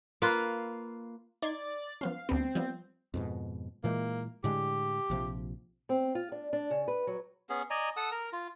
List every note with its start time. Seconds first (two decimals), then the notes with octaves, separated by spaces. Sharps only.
0.22 A#3 F4 B4
1.42 D#4 D5 C6 G#6
2.01 F3 B3 C#4 F5
2.29 D2 G3 B3 C4
2.55 F3 G3 B3
3.14 F2 G#2 B2
3.84 A#2 E3 G#3 A#3
4.44 A2 D3 G#3 G4
5.10 A#1 C3 F3
5.89 C4
6.15 F4
6.32 D4
6.53 D4
6.70 C#3
6.88 B4
7.07 F#3
7.49 B3 C#4 G#4
7.70 D5 D#5 G#5 A#5
7.97 A4 F#5 D#6 E6
8.12 A#4 A#5
8.33 F4